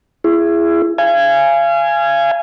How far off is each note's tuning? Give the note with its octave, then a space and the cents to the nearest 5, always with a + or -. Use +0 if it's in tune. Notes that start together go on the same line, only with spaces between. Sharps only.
E4 +30 G#4 +0
F5 -35 G#5 +0